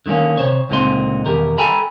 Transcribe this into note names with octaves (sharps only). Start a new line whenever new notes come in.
D3 D#3 G3 A#3 C#4
C3 C5 C#5
C#2 A#2 D3 C4 D#4 C6
E2 B2 D#3 G4 A#4
A4 G5 G#5 A#5 B5